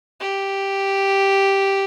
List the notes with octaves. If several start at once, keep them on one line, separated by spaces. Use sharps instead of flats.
G4